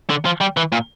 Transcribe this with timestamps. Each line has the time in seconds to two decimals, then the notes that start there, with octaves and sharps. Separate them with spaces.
0.10 D3
0.25 F3
0.41 G3
0.57 E3
0.72 A#2